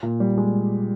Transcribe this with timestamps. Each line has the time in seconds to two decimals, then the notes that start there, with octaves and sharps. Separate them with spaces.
0.03 A#2
0.20 G3
0.38 G#3